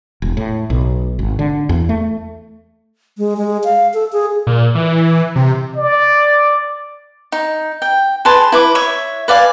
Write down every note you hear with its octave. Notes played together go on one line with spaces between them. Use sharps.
E1
A2
B1
G#1
D3
E2
A3
G#3
G#3
F5
A4
G#4
A#2
E3
C3
D5
D#4
G5
G#4 B4 A5 C6
E4 B4 D6
C#5 E5
B4 D5 F5 G#5